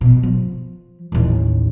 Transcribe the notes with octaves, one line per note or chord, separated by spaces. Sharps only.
B2
F3
A1 D#2